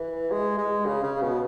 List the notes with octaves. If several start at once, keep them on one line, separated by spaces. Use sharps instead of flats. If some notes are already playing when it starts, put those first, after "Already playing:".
Already playing: E3
G#3
G#3
C#3
C#3
B2